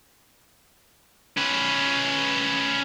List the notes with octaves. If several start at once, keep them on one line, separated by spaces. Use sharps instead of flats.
C#4 B4